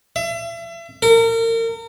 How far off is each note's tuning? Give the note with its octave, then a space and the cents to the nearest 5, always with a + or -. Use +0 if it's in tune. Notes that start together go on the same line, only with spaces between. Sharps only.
E5 +35
A#4 -35